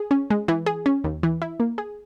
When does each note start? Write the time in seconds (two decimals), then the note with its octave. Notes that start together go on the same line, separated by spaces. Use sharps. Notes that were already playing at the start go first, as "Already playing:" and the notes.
Already playing: G#4
0.11 C#4
0.30 G#3
0.48 E3
0.66 G#4
0.86 C#4
1.04 D#2
1.23 E3
1.42 E4
1.60 A#3
1.78 G#4